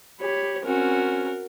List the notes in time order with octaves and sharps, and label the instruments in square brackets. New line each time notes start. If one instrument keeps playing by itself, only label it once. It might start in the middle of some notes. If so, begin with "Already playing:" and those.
[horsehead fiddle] G4 B5 [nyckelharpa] C#5
[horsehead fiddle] C4 C#4 [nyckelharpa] F#4 A#4